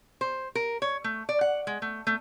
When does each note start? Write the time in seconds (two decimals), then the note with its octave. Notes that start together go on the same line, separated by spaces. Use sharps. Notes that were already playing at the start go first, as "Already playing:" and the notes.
0.21 C5
0.55 A#4
0.82 C#5
1.04 A3
1.29 D5
1.41 F#5
1.67 G#3
1.82 A3
2.07 A3